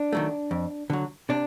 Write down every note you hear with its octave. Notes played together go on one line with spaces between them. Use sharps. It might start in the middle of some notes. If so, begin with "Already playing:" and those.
Already playing: D4
D#3 F#3 A3
F2
D3 F#3
C3 D4